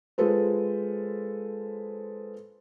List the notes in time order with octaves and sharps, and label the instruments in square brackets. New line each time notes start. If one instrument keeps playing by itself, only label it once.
[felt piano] G#3 F4 A4 B4 C5